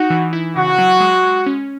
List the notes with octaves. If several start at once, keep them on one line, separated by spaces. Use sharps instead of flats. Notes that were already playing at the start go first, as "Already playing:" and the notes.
Already playing: D#4 F#4
E3
E4
C#3 F#4
F#3
G#3
G#3
C#4